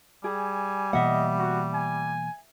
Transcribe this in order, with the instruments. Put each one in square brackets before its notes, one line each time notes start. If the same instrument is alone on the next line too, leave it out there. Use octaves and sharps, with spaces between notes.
[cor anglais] G3 [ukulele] G#4 [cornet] G#5
[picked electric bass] B2 E3 A#3 [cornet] D#5 [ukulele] E5 F#5
[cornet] F#4
G#5